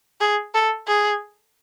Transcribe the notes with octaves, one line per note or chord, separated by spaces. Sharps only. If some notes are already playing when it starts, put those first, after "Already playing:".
G#4
A4
G#4